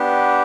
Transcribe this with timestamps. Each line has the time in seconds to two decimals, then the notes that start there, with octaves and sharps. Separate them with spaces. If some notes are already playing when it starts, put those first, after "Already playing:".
Already playing: B3 D4 G4